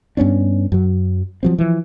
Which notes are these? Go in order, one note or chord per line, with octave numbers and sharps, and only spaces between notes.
G2 B3 C#4 D4
F#2 F#3
F3 F#3 C4
E3 F3